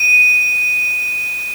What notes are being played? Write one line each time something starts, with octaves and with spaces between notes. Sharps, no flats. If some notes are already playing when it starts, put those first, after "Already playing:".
Already playing: D#7